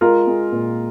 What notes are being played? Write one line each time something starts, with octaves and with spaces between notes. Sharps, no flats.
G#3 F4 A#4
G#3
A#2